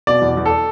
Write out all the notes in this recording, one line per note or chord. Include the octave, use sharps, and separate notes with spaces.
B2 D5
E2
E2
A4